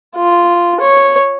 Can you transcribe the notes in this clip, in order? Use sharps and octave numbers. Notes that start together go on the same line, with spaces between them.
F4
C#5